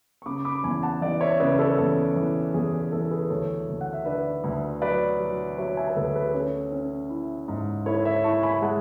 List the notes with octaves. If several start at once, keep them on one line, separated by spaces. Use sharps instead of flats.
C#6
C#3 B5 D6
B5 D6
E2 G#5 B5
F#5 A5
E3 D5 F#5
C#5 E5
C#3 B4 D5
A4 C#5
E2 A4
E3
E2 G#4
G#4
E3 A4
G#4 B4
D2 A4 C#5
D2
F#5
E5
D3 B4 D5
D2
F#3 B4 D5
F#3
F#3 C#5 E5
E5 G#5
B4
D2 A4
G#4 B4
C#4 A4 C#5
C#4
E4
G#2
E4 A4 C#5
C#5 E5
E4 A5 C#6
G#5 B5
G#3 F#5 A5